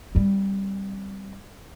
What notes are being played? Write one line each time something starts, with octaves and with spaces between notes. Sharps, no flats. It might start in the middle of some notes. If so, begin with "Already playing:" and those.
G3 C4